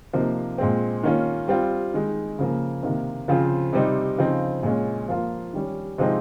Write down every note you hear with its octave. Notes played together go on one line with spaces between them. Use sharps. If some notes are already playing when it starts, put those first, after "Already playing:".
C3 F3 A#3 D#4
A#2 G#3 C4
D#3 A#3 C#4 F4
G3 C4 F4
D#3 G#3 D#4
C#3 F3 A#3
C3 D#3 A#3
C#3 F3 C4 F4
C3 G3 C4 D#4
C#3 F3 C4 D#4
A#2 G#3 C#4
F3 A#3 F4
D#3 G3 C#4
C3 F3 G#3 C4 D#4